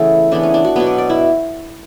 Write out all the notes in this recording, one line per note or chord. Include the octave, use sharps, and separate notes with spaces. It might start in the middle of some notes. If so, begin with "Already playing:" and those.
Already playing: C#3 E3 A3 B3 A4
C#3 E3 B3 D4
C#4
D4
F#4
B2 F#3 B3
D5
D5
E4